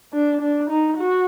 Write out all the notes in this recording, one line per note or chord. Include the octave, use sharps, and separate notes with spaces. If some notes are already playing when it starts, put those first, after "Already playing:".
D4
D4
D#4
F#4